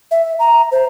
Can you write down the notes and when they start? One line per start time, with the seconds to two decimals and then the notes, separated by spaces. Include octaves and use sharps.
0.11 E5
0.39 A#5
0.72 C5